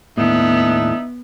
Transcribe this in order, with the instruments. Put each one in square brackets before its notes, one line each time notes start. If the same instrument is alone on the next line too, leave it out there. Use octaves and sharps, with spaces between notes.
[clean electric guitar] D#2 A2 [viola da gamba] B3 [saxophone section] D4 D#4 E5